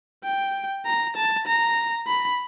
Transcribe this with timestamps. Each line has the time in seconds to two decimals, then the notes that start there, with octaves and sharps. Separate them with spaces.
0.24 G5
0.86 A#5
1.16 A5
1.47 A#5
2.07 B5